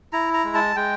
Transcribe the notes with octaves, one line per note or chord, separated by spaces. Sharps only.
E4 A#5
A#5
G#3
A5
G#3 G5